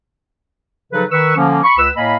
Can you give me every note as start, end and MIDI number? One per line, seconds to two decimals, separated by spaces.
0.92 1.04 49
0.92 1.04 53
0.92 1.04 54
0.92 1.04 63
0.92 1.04 69
0.92 1.04 71
1.11 1.34 51
1.11 1.34 71
1.11 1.34 85
1.11 1.34 88
1.36 1.59 50
1.36 1.59 53
1.36 1.59 58
1.36 1.59 61
1.63 1.77 83
1.63 1.77 85
1.78 1.90 37
1.78 1.90 71
1.78 1.90 88
1.96 2.16 45
1.96 2.16 58
1.96 2.16 75
1.96 2.16 77
1.96 2.16 80
1.96 2.16 83